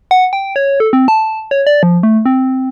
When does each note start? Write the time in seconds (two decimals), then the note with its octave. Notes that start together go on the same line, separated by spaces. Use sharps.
0.11 F#5
0.33 G5
0.56 C#5
0.80 A4
0.93 C4
1.08 A5
1.51 C#5
1.67 D5
1.83 F3
2.03 A3
2.26 C4